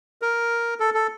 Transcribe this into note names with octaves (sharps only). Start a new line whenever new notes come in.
A#4
A4
A4